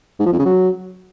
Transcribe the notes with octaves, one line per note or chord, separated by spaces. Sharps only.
G#2
F3
F2
C#3
F#3